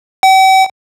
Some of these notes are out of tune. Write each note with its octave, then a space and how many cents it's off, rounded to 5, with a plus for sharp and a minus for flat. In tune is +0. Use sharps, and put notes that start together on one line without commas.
G5 -45